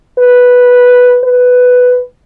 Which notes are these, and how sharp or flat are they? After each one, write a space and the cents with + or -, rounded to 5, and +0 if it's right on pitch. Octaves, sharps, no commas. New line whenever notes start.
B4 -5
B4 +5